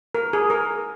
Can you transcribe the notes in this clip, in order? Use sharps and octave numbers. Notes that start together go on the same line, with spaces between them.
A#4
G#4
A#4